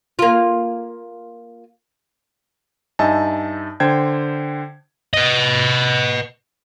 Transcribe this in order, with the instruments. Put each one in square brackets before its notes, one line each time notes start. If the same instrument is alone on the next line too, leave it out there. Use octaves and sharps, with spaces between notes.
[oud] A#3 F4
[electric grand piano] G2 D#4 D#5 E5 G#5 A5
D3 C5 G5 G#6
[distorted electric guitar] B4 D#5